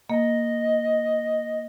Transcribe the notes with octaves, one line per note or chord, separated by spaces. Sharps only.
A#3 D#5